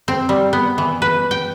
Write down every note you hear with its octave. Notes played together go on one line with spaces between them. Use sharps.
C4
G3
B3
E3
B4
G5